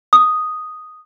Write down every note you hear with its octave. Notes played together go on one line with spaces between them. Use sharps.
D#6